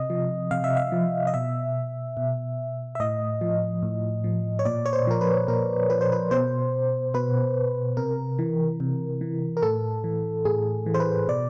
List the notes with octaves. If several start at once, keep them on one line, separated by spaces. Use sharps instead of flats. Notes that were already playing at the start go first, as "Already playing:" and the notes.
Already playing: C3 D#5
F3
C3 F5
E5
F5
F3
D#5
B2 E5
B2
E5
A2 D#5
F3
A2
F3
C#5
A#2 D5
C#5
C5
F3 A#4
B4
A#2 A#4
F3 B4
C5
B4
B2 C5
B2 B4
C3 A#4
E3
C3
E3
A#4
A2 A4
E3
A2 G#4
E3
C5
B4
B2 D5